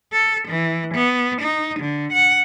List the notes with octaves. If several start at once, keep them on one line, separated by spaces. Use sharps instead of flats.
A4
E3
B3
D#4
D3
F#5